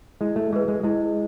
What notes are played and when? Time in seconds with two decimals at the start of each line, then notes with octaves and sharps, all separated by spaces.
0.21 G#3 E4
0.36 A3
0.53 G#3 G#4 B4
0.68 G#3
0.83 G#3 E4